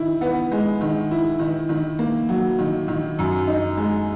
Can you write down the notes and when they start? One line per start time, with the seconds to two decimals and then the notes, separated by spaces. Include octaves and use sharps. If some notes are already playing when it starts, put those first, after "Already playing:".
Already playing: D#3 E4
0.21 B3
0.52 G#3
0.81 D#3
1.11 E4
1.40 D#3
1.69 D#3
1.99 A#3
2.29 F#3
2.59 D#3
2.88 D#3
3.19 F#2
3.48 D#4
3.77 G#3